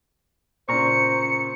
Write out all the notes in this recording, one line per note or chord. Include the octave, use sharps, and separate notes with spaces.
A#2 C#3 C5 A#5 C#6 C#7